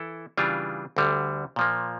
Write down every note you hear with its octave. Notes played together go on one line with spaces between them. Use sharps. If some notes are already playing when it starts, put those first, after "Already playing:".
Already playing: E3 E4 A4
C#3 E3 G3 D4 F4
D2 D3 G3
A#2 F3 A#3